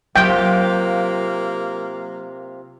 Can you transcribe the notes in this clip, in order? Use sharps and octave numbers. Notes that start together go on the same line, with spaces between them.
C3 F#3 A#3 F4 G4 G5